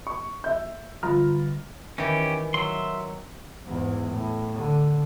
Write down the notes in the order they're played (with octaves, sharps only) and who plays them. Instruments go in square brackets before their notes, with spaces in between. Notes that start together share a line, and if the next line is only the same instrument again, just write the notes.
[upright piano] C#6
E5 G6
G1 F4 A#5 B5 F6
[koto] D#3 E3 [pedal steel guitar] C#4 G4
[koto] F#3 [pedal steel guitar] E5 C6
[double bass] E2 G#2
A2
D3